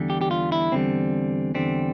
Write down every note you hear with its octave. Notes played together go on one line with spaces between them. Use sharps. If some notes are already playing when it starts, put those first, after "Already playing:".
Already playing: E2 D3 G3
G4
G4
F4
E4
E2 D3 G3 C4
E2 D3 G3 C4